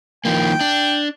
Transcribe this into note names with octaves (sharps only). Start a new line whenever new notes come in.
D#3 F3 A#3 G5
D4